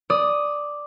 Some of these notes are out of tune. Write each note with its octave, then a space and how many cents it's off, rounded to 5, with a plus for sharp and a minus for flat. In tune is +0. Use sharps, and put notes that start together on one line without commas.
D5 +0 D#6 +0